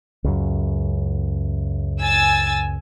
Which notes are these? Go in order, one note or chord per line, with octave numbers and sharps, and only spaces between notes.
C#2 F#2
G#5 E6 A6